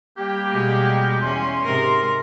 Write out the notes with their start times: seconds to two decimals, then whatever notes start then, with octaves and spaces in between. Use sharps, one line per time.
0.17 G3 A#3 G4
0.49 B2 G#3
1.22 E2 C#4 C6
1.65 G#2 C3 A#4